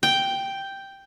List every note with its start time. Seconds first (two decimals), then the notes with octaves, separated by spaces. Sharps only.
0.03 G5